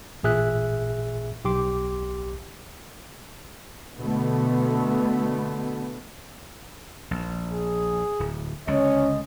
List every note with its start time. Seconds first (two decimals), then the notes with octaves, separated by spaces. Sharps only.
0.23 A1 A#2 G#4 E5 F#6
1.45 B1 G4 C6 D6
3.97 B2 D3 A3 B3
7.11 A#1
7.52 G#4
8.20 D1
8.67 C#2 D3 C#4 D#5